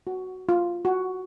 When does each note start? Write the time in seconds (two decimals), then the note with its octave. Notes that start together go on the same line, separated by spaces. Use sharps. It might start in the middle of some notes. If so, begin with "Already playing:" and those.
0.07 F#4
0.49 F4
0.85 F#4